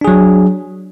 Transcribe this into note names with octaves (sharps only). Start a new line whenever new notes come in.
F#3 D4 G#4